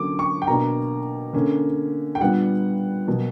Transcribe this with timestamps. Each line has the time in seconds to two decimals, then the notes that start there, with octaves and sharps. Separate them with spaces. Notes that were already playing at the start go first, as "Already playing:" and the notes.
Already playing: D3 F#3 A#3 C#4 D6
0.19 C#6
0.42 G5
0.47 B2 A#3 D4 A#5
1.33 D3 A#3 C#4
2.15 G5
2.20 A#2 G3 B3 D4 F#5
3.08 B2 F#3 A#3